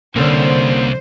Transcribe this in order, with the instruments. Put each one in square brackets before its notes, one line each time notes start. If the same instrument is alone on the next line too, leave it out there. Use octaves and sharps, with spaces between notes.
[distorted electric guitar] C2 [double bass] D3 [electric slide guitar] A#3 C#4 [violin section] C5